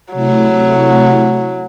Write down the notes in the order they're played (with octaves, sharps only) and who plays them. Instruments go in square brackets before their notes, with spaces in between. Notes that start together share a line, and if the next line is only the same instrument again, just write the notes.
[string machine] C3 A3 E4 [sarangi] F#3